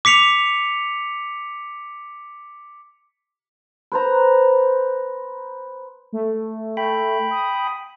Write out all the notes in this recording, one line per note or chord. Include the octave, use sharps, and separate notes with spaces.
D6 B6 C#7 F7
B4 C5 A#5
A3
A3 G5 B5
D#6